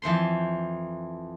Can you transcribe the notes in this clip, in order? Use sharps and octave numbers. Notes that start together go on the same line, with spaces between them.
F2 E3 C5 C6